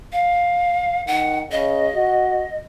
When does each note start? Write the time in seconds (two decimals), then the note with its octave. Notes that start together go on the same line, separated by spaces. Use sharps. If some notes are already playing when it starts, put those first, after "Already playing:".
0.12 F5
1.07 D#3 F#5
1.51 C#3 D#5
1.95 F#4